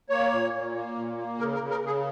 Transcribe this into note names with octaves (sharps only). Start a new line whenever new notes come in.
A#3 C#5
A#2
A#2
A#3
A#2
A#3
C#3 A#4
A#4
C#3
A#4
C#3 G#4